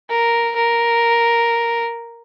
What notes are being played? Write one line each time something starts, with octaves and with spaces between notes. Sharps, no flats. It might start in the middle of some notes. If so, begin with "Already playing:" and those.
A#4
A#4